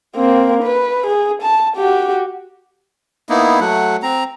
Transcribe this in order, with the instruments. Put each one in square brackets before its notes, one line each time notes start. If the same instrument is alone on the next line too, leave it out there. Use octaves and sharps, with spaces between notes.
[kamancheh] A#3 C4
B4
G#4
A5
F#4 G4
[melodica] A#3 B3 D#4 E4
F#3 A3 F#5
C4 A#5